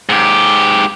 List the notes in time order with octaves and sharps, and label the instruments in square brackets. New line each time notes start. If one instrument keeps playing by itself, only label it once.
[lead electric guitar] G#2 G4